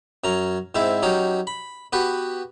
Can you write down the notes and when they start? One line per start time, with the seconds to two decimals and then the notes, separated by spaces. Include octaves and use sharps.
0.24 F#2 C#4 A#5
0.75 G#2 C4 E4 E5 D6
1.03 F#3 C#4 D#4 G4 D#6
1.47 B5
1.93 B3 F#4 G4 B4